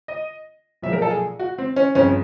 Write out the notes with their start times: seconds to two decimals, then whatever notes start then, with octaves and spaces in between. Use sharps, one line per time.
0.08 D#5
0.82 B1 A#2 F3 G#3 E5
0.93 A#4
1.02 A4
1.11 G#4
1.39 F#4
1.58 C4
1.76 C#4
1.95 G1 F2 C#3 C#4